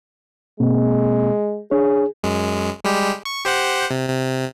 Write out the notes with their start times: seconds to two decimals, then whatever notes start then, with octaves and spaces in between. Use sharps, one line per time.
0.60 B2 G#3 A#3 C4
1.71 D4 G#4 C#5
2.23 F#2 G#3
2.84 G3 G#3 G4
3.25 C#6
3.44 G4 C5 F#5
3.90 C3
4.09 C3